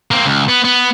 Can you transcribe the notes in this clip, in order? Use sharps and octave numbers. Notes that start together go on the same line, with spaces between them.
A#3 C4
C#2
B3
B3